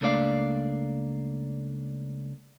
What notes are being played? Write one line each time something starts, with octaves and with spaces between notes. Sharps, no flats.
C#2 A3 A#3 D4 D5 F5